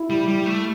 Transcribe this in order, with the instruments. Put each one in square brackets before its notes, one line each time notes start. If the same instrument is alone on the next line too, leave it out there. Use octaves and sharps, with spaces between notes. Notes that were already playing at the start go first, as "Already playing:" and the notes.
Already playing: [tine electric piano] E4
[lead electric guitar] G3
G3
A3